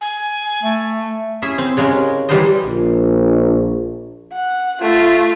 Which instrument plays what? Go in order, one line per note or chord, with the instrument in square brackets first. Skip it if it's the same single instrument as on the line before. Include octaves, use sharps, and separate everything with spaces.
[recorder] G#5
[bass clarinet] A3
[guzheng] C#4 E4 G#4 E5
C4
C#3 G#3 C#4 A#4
E3 G3 G#3 A#4 C5 D#5
[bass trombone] A#1
[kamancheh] F#5
A3 F4